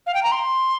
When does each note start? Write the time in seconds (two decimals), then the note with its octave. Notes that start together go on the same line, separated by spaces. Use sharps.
0.07 F5
0.14 G5
0.23 A#5
0.32 C6